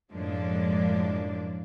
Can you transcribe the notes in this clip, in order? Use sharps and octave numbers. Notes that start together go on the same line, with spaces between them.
F#2 A2 F3 G#3 A#3 D4